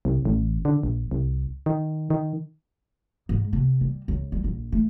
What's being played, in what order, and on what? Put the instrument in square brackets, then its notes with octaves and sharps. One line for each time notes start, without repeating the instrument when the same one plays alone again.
[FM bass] C2
A1
D3
A#1
C2
D#3
D#3
[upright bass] G#2
C3
G3
C#2
G3
A#1
A3